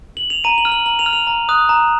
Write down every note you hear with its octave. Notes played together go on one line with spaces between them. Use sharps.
F#7
F7
A#5 D#7
F#7
F6
F#7
A#5 F#7
F7
F6
F7
A#5
D#6 F#6
A#5